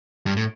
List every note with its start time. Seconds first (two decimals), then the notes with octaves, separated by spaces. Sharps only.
0.26 G2
0.36 A2